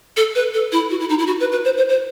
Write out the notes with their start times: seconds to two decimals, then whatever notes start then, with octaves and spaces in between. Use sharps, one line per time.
0.17 A4
0.35 B4
0.54 A4
0.72 E4
0.90 F#4
1.00 E4
1.09 D#4
1.19 E4
1.27 F#4
1.40 B4
1.52 B4
1.65 C5
1.77 C5
1.89 C5